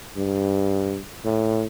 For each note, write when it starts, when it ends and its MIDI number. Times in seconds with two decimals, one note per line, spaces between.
0.17 1.00 43
1.25 1.66 45